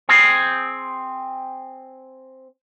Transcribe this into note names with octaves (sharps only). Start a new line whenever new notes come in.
C4 G#4